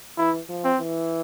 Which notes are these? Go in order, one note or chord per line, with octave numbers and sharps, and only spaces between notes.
E3 E4
F3
C4
E3